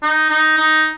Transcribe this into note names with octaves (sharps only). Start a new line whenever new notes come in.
D#4
D#4
D#4